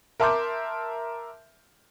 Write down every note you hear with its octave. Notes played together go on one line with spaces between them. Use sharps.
A#4 E5 A5 C6 D6 G6